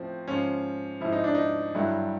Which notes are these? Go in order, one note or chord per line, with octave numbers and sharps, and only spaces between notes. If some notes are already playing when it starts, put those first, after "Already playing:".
Already playing: A2 F3 C4
G#2 F3 C#4
G#2 F3 E4
D#4
D4
D#4
G2 D3 F#3 E4